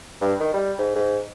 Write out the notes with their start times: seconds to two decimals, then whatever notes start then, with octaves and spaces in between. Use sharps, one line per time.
0.21 G2
0.40 D#3
0.54 G3
0.78 G#2
0.95 G#2